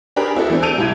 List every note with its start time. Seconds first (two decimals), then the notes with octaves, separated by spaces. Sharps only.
0.16 D4 G4 G#4 A#4 B4
0.35 C4 E4 F#4 A4
0.50 E3 A3 C4 D4
0.62 A5 E6 G6 D7 D#7 F7
0.78 C2 C3 E4 G#6